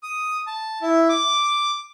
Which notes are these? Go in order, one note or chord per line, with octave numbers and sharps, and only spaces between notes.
D#6
A5
E4
D6